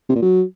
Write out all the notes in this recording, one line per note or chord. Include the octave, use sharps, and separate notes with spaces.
C3
A#2
F#3